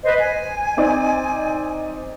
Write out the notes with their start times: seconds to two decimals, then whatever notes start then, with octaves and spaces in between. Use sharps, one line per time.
0.03 B4 C5 D#5
0.19 G#5
0.77 C4 D#4 D5